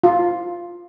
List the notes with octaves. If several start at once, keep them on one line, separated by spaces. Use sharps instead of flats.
F4